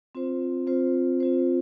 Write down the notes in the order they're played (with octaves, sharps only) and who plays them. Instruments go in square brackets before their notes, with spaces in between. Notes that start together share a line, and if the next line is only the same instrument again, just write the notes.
[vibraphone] C4 F4 C5
C4 F4 C5
C4 F4 C5